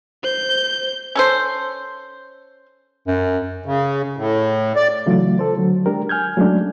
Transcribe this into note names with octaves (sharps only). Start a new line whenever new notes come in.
C5 G6
C#4 A4 C5
F#2
C#3
A2
D5
C#3 E3 F#3 A3 F4
A4 C5
D3 F#3
G#3 D4 G4 A#4
G#5 F6 G6 G#6
F#3 G#3 A3 C#4 D4